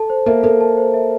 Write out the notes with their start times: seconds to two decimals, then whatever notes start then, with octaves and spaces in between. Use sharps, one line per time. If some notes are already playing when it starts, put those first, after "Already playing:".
Already playing: A4 A5
0.10 C5
0.26 A#3 E5
0.43 A#3 A4
0.61 A5
0.77 C5
0.94 E5